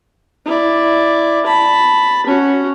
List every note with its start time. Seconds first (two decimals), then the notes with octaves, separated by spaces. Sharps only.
0.45 E4 D5
1.46 A5 B5
2.26 C#4 F#4